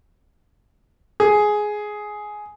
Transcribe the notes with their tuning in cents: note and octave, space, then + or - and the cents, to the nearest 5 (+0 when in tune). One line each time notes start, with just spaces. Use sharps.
G#4 +10